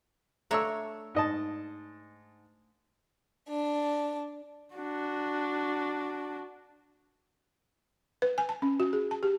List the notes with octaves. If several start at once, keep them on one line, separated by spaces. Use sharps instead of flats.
A3 D4 C#5 A#5 E6
G#2 D#5 A5
D4
D4 F#4
B4
G#5
A5
C#4
F#4
G#4
A5
G4